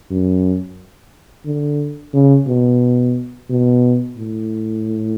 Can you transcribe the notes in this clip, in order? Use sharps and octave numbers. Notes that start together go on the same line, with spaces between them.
F#2
D3
C#3
B2
B2
A2